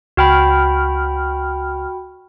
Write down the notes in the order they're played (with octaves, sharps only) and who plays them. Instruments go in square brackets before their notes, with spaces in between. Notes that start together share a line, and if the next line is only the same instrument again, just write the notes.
[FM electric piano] C#2 F6 [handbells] F#4 G5 B5